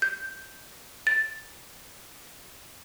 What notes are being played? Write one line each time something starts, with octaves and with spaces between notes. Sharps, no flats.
G6
A6